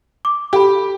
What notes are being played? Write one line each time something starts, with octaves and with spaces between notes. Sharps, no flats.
D6
G4 A4 B5